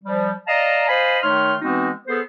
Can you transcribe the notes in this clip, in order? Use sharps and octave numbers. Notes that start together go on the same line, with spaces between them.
F3 G3
D5 D#5 F5 A5 A#5
C5 D#5 F5 G#5 B5
D#3 A3 D#4 C#5 C6 F6
E3 G#3 B3 C4 D#4 F#4
B3 G#4 A4 B4 C5